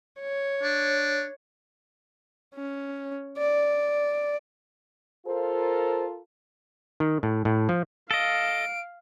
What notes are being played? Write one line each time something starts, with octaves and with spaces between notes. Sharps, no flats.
C#5
D4
C#4
D5
F4 A4 A#4 C5
D#3
A2
A2
F3
A4 D#5 F5 D7